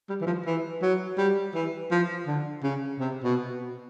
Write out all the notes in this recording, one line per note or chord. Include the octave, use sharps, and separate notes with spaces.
G3
E3
F3
E3
F#3
G3
E3
F3
D3
C#3
C3
B2